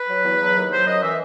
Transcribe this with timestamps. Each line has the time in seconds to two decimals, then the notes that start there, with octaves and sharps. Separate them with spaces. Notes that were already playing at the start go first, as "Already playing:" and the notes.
Already playing: B4
0.08 F#3
0.24 E2
0.40 F#3
0.56 D#2
0.71 F#3 C5
0.86 F#2 D#5
1.03 E3 E5